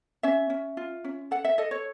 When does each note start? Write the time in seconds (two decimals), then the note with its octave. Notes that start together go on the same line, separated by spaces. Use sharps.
0.23 C#4 E5
0.50 C#4
0.77 F4
1.04 C#4
1.31 A4 F#5
1.45 E5
1.58 A4 D#5
1.71 C#5